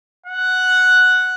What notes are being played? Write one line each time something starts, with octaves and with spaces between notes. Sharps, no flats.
F#5